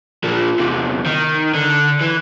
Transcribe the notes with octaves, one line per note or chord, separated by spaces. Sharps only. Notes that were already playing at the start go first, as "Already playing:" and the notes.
A#2 F3
E2 C3
D#3
D3
E3